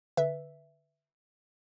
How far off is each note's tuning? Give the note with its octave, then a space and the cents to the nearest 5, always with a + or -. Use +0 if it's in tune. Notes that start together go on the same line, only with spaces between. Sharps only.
D3 +0 B4 +0 E5 +0